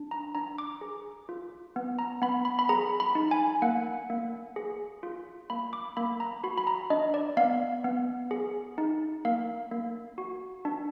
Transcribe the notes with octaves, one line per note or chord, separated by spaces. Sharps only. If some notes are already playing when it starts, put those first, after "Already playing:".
Already playing: D4
A#5
D4 A#5
D6
G#4
F4
B3
A#5
B3 B5
B5
B5
G#4 A#5
B5
D#4
G#5
A#3 F#5
A#3
G#4
F4
A#3 B5
D6
A#3 B5
A#5
F#4 B5
B5
A#5
D4 D#5
D5
B3 F5
B3
G#4
D#4
A#3 F5
A#3
F#4
D4